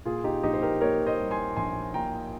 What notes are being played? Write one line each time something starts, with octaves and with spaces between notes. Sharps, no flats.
A#2 F4 G#4
D#4 G4
A#1 D#4 G4
C5
G4 A#4
A#3 A#4 C#5
C5 D#5
G3
G#5 C6
A#1 G#5 C6
A#2 G5 A#5